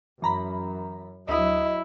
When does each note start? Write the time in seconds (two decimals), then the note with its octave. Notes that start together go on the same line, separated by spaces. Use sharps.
0.22 F#2 E3 A#5 B5
1.29 D2 F#3 E4 D#5 D#6